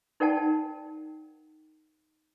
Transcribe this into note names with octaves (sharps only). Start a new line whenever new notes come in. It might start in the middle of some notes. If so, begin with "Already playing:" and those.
D#4 A#4 D5 F#5 G5 A5